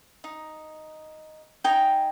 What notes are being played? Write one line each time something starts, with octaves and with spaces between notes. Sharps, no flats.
D#4
D#4 G5 G#5 A#5